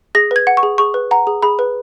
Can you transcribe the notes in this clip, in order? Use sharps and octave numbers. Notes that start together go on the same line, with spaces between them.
G#4 A#6
B4 G#6
F#5
C#6
G#4
G#4 C#6
B4
F#5 A#5
G#4
G#4 B5
B4